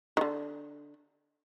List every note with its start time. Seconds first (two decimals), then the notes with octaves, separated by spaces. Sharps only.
0.17 D3 D#3